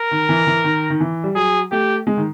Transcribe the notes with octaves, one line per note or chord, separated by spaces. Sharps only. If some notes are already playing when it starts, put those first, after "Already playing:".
Already playing: A#4
D#3
E3
E3
D#3
D#3
E3
G3
F#3 G#4
A3 G4
G#3
D#3